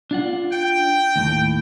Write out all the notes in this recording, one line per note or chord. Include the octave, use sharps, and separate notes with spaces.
D4 F4 F#5
G5
D#2 A2